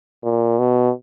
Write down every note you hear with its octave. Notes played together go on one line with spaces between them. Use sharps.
A#2
B2